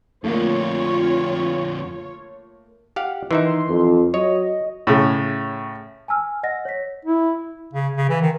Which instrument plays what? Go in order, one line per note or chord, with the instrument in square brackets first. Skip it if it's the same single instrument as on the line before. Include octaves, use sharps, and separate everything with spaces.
[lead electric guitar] F2 D3 [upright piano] A3 A#3 [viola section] F4 C#5
[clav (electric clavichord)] G4 F5 F#5
[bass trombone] D#3 [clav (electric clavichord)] E3 D#4 E5 [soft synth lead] C6
[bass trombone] F2
[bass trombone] F#3 [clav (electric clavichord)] C#5 [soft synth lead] D#5
[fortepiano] A2 C#3
[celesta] G#5 A5 E6 F6
D#5 F#5 A#6
C#5 B6
[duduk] E4
[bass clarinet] C#3
C#3
E3
D#3